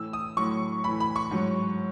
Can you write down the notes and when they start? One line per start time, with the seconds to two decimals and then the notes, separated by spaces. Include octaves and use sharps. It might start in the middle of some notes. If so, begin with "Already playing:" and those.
Already playing: A2 E3 E6
0.13 D#6
0.37 A2 F#3 C#6
0.84 A2 E3 B5
1.00 B5
1.16 C#6
1.31 G#2 F#3